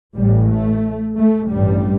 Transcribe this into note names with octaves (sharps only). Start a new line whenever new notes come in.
A1 A2 G3
A3
A3
A1 G2 G3